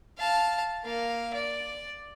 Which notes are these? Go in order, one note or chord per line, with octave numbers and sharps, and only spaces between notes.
F5 A5
A#3 F5
D5